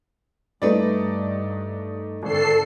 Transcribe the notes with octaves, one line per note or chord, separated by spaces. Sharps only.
G2 G3 A3 D#4 B4 D5
G#1 G#2 D3 A4 C7